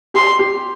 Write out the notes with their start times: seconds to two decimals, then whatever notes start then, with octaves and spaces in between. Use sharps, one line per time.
0.14 G4 C6
0.39 G4